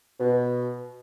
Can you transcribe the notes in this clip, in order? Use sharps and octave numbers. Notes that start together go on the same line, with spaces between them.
B2